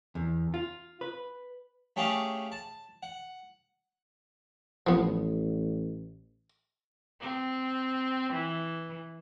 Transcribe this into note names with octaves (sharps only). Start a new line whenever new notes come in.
E2
F4
B4
A3 C#4 G4 G#4 F5 A5
A5
F#5
A1 F3 B3
C4
E3